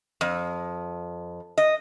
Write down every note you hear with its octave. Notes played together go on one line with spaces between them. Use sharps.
F2
D#5